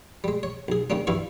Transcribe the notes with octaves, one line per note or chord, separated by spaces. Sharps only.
G3 G#3
C#5
B1 G#4
C3 D#3 G3 A#3 C#4 D4
G2 E3 G3 E4 F5 C#6